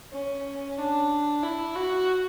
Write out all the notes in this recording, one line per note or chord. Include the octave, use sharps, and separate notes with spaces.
C#4
D4
E4
F#4